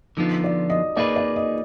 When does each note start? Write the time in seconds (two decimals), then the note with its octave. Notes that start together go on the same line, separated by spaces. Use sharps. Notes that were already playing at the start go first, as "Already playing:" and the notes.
0.17 D3 F3 B3 D#4 F4
0.44 D5
0.70 D#5
0.97 A#3 D#4 G#4 B4 D5
1.16 D5
1.36 D#5